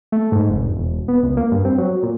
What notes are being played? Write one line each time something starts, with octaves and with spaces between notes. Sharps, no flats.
A3
G#2
F1
E1
B3
C#2
A#3
G2
C4
F#3
A#2